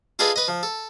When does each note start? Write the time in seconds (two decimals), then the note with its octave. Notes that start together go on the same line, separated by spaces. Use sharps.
0.19 F4 G#4 A4 B4 D5 D#5
0.36 B4 D#5
0.48 F3
0.63 A4